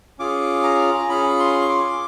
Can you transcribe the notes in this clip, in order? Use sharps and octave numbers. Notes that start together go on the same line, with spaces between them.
C#4 F4 G#4 D6
A#5
C#4 F4 G#4 B5
C6
C#6
D6